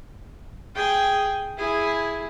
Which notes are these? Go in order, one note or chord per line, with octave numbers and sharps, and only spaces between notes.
G#4 G5
E4 G#4